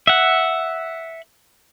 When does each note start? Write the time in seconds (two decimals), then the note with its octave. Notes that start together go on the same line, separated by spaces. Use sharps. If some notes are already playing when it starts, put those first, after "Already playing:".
0.07 E5 F#5